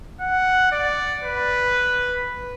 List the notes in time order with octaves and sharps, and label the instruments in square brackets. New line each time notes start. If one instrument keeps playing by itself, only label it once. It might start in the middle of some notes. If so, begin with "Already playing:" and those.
[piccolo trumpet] F#5
D5
B4